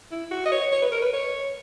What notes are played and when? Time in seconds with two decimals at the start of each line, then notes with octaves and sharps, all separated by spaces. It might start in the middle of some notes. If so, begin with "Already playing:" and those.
0.12 E4
0.31 F#4
0.46 D#5
0.52 C#5
0.72 C#5
0.82 B4
0.92 A#4
1.02 B4
1.14 C#5